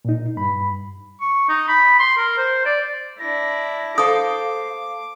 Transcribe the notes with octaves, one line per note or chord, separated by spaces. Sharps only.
A#2 D#4
G2 B5
C#6
D#4
B5
C6
A#4
C5
D5
D4 E4 A#6
A4 C5 F5 D6 D#6